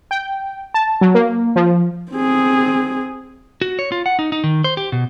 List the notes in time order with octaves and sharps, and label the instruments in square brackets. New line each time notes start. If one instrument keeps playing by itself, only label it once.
[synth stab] G5
A5
F#3
A#3
F3
[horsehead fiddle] C4 G#4
[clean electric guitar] F#4
C#5
F4
F#5
D#4
D#4
D#3
C5
G4
B2